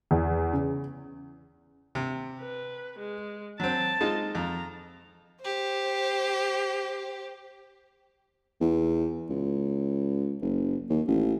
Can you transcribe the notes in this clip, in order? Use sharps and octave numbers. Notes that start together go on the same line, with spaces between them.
E2
C#3
C3
B4
G#3
F#3 C4 A5
G#3 D#4 F4
F2 A#5
G4 C5
E2
C#2
F#1
D#2
A1